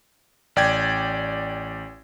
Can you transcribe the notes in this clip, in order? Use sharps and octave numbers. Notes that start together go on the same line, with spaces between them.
A1 D5 G5 G#6